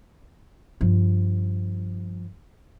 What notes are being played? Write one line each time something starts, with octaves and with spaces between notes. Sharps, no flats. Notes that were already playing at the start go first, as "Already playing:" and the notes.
G2 F3